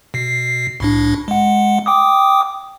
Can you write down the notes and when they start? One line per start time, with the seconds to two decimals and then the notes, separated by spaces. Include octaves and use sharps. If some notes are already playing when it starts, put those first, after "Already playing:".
0.14 B2 C7
0.80 C2 A2 D4
1.28 G#3 F#5
1.86 G5 D6 D#6